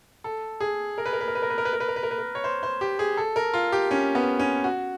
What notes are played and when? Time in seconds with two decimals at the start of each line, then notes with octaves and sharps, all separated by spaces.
0.24 A4
0.60 G#4
0.98 A#4
1.06 B4
1.13 A#4
1.21 B4
1.28 A#4
1.35 B4
1.42 A#4
1.50 B4
1.58 A#4
1.65 B4
1.73 A#4
1.80 B4
1.88 A#4
1.96 B4
2.03 A#4
2.11 B4
2.18 A#4
2.35 C#5
2.44 C5
2.63 C5
2.81 G4
2.99 G#4
3.17 A4
3.36 A#4
3.54 F4
3.72 G4
3.91 C#4
4.15 B3
4.39 C#4
4.64 F#4